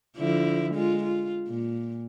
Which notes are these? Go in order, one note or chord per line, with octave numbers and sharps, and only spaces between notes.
D3 F3 E4
G#3 F4
F4
A#2